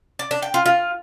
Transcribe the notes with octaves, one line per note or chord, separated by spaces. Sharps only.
D5
D4
G5
F4
F4